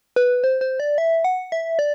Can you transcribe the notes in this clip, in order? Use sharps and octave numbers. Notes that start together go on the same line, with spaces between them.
B4
C5
C5
D5
E5
F#5
E5
D5